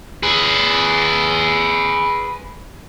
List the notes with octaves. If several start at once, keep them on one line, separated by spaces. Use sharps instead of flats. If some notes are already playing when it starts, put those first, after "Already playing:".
G#4 B4